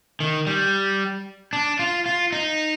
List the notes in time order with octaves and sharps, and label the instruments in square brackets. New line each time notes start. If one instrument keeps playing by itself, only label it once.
[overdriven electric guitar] D#3
G3
D4
F4
F4
D#4